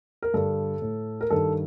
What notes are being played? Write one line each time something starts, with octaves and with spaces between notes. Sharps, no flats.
A#4
G2 D3 A4
A2
A#4
G2 D#3 A4